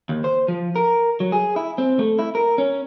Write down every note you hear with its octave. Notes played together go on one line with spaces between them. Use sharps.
D#2
C5
F3
A#4
F#3
G#4
E4
C4
A3
E4
A#4
C#4